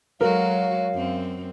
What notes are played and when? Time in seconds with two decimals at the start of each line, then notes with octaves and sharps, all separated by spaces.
0.21 F#3 G#3 F#4 A#4 C#5 F5
0.94 F#2 C4